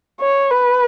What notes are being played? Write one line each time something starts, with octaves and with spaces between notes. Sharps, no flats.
C#5
B4